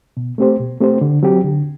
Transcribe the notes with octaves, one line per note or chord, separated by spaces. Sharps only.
B2
A3 C4 G4 C5
B2
A3 C4 G4 C5
D3
F#3 C4 G4
D3